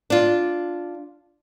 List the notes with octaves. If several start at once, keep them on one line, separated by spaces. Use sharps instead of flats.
D4 F4